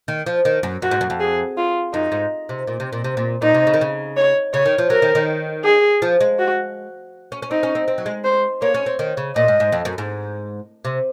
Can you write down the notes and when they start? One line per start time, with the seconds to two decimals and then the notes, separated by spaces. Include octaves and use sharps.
0.08 D#3
0.26 F3
0.45 D#3
0.63 F#2
0.82 F#2 F#4
0.91 G#2
1.01 F#2
1.10 F2
1.20 G#4
1.57 F4
1.93 F#2 D#4
2.12 G#2
2.49 C3
2.67 A#2
2.80 C3
2.93 A#2
3.04 C3
3.17 A#2
3.42 A#2 D#4
3.54 C3
3.67 C#3
3.74 D#3
3.81 C#3
4.17 C#5
4.53 C#3 C#5
4.65 D#3
4.78 F3
4.90 F#3 A#4
5.02 D#3
5.15 D#3
5.64 G#4
6.02 F3
6.21 G#3
6.39 F#4
7.32 C#4
7.42 C#4
7.50 C4 D#4
7.63 C#4
7.75 C4
7.88 C4
7.98 F#3
8.06 G#3
8.24 C5
8.62 A#3 C#5
8.74 C#4
8.86 C4
8.99 D#3
9.17 C#3
9.35 A#2 D#5
9.48 G#2
9.60 G#2
9.72 F2
9.85 F#2
9.98 G#2
10.85 C3